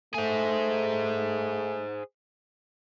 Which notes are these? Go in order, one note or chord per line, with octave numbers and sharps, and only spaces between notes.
A3 G#4 C5